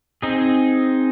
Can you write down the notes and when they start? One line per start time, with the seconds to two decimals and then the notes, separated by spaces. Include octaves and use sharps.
0.22 C4 D#4 G#4